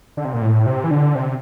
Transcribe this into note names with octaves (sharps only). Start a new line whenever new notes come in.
D3
C3
A#2
A2
C3
E3
D3
C3